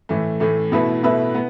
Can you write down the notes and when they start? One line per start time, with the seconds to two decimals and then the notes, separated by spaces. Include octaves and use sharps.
0.09 A2 E3 A3
0.40 A2 E3 A3
0.72 B2 A3 E4 B4 E5
1.03 B2 A3 E4 B4 E5
1.35 B3